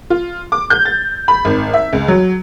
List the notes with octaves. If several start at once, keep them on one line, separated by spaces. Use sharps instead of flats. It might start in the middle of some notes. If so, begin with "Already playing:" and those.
F4
D6
G6
A6
B5
G#1
E5
C#2
F#3